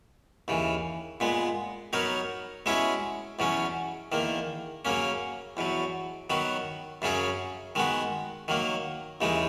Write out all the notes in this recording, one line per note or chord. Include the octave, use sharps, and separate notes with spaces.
D#2 C#3 E3
A#2 G#3 B3
F#3 B3 D#4 A#4 C#5
B2 G#3 C#4 E4 G#4
E2 B2 F#3 C#4
E2 D#3 A#3
C#3 F#3 A#3 C#4
E2 B2 F#3
D#3 F#3 B3 F#4
F#2 C#3 F#3 C#4 G#4
D#3 G#3 B3 F#4
D#3 F#3 A#3
D#2 C#3 E3 G#3 D#4